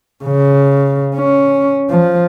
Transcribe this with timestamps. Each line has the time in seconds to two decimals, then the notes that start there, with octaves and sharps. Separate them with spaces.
0.25 C#3
1.15 C#4
1.90 F3